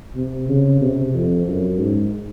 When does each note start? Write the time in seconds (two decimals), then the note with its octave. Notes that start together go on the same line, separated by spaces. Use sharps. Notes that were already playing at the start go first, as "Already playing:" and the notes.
0.15 C3
0.49 C#3
0.81 C3
1.14 F2
1.47 F#2
1.79 G#2